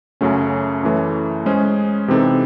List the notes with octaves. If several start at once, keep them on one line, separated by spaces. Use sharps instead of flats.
F#2 C#3 F#3 A3 C#4
F#2 E3 A3
G#3 C#4 G#4 C5
C3 E3 C4 D#4 A4